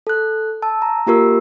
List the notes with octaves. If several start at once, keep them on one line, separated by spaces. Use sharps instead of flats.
A4 F#6
A5 E6
A#5
A#3 F4 G4 A#4 E6